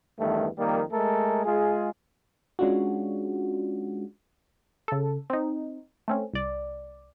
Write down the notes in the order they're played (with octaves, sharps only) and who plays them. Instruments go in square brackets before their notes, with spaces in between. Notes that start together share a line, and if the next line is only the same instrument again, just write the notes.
[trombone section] E2 G2 D#3 A3
F2 D#3 G3 A#3
G#3 A3 A4 A#4
G#3 F4 G#4
[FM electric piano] G#3 C#4 D4 F4 F#4
[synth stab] C#3 A4
C4 D#4
A3 C4 C#4
C2 D5